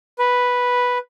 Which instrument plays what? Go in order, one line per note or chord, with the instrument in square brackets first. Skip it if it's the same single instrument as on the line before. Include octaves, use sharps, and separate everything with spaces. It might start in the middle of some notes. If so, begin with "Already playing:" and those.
[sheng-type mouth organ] B4